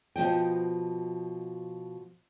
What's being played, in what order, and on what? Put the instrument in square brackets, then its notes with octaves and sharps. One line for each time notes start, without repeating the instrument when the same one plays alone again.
[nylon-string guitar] B2 F3 D#5 G5